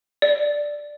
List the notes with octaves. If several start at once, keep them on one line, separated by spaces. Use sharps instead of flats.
D5